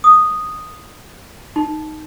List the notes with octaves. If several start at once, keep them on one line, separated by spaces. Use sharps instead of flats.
D#6
D#4